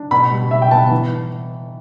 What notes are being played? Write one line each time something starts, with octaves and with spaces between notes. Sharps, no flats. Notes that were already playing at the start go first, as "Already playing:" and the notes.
Already playing: D4
B2 B5
G3
B2 E5
G5
B3 A5
E3